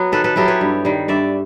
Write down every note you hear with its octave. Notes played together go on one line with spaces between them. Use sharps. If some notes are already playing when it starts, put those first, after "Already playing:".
Already playing: F#3 B3
D#3 A4 B4
A4 B4
F#3 B3 E4 G4 A4
B4 C#5
G2
D#3 G3
G2 D5 E5